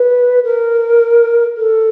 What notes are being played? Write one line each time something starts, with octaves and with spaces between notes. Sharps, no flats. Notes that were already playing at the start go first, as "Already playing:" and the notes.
Already playing: B4
A#4
A4